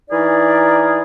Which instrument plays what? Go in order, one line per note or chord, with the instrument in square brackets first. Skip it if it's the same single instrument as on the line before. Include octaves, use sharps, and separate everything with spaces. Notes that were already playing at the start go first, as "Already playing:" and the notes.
[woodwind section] E3 D#4 G#4 A#4 D5